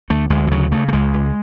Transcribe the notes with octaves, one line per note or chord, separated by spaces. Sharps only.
D2 A3
D2 G#3
E3
C#3 F#3
C#3 A3
A3
C#2 G#3
C#2